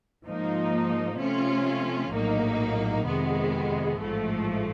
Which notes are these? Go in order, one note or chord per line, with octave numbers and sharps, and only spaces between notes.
G#2 F3 A#3 D#4
C3 F3 A3 C#4 F4
A#1 A2 F#3 A#3 D#4
F2 C3 D#3 G#3 B3
A1 G#2 F3 A3